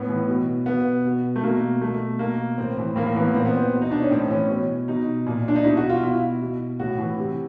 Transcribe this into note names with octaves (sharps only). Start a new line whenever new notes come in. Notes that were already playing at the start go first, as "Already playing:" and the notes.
Already playing: A2 B3
E3
B2
B2 B3
B2
A3
B2 A#3
B2 A3
B2 A#3
A2 C4
E3
A2 A#3
A#3
E3 B3
A#2 C4
B3
C4
B2
D#4
D4
C#4
A2 C4
E3 C#4
B2
B2 D#4
A#2
D4
D#4
B2 E4
F#4
F4
B2 E4
B2
A2 F#4
E3
C3